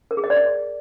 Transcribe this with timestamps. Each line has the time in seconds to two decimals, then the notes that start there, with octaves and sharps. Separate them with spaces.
0.11 A#4
0.17 G#4
0.24 D#5
0.30 D5
0.37 D#5